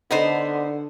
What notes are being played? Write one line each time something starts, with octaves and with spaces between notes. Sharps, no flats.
D3 B3 D#4 C5